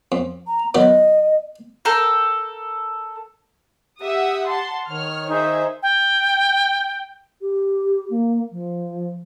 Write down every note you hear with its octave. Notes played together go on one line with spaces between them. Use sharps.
F2
A#5
D#3 F#3 B3 D#5
A4 A#4 G5
G4 E5 F#5 D#6
F#5 A5 C6
D#3 C#5 F6
D#4 G#4 C5 E5
G5
G4
A#3
F3